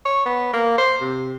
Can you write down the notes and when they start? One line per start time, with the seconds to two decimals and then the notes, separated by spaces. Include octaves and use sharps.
0.05 C#5
0.26 B3
0.53 A#3
0.78 C5
1.01 C3